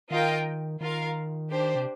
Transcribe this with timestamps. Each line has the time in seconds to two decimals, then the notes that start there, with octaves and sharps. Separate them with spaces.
0.10 D#3 F4 A#4 D#5 G5
0.81 D#3 F4 A#4 F5
1.51 D4 G4 C5
1.75 C3